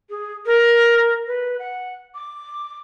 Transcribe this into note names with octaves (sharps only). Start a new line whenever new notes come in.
G#4
A#4
B4
F#5
D6